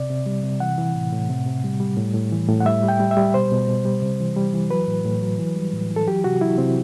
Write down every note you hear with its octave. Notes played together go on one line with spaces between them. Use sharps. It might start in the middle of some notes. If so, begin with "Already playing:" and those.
Already playing: C3 D5
C3
G3
C3
E3 F#5
E3
A2
A2
C3
C3
G3
G3
A2
A2
E3
A2
F#5
G3 E5
G3
G5
G3
E5
G3
B2 C5
B2
B2
G3
C3
E3
G3
E3
F#3 B4
A2
A2
F#3
E3
G3
A2
E3
A4
F#3 G4
C3 F#4
F#3 E4
C3 C4